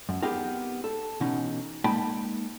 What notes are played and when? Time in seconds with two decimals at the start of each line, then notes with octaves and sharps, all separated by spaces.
0.09 F#2
0.23 B3 C4 D#4 G4 G#4 A#4
0.84 A4
1.20 B2 E3 C#4 D#4
1.84 G#3 A#3 D#4 G5 A5 B5